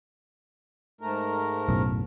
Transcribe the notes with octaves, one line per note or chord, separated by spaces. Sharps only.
G#2 A3 A#4
B1 F#2 A2